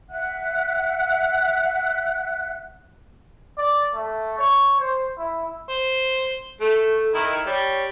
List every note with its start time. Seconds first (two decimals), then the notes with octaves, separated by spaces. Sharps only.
0.11 E5 F#5 F#6
3.58 D5
3.94 A3
4.39 C#5
4.80 C5
5.18 E4
5.69 C5
6.61 A3 A4
7.14 D#3 E4
7.46 G3 C#5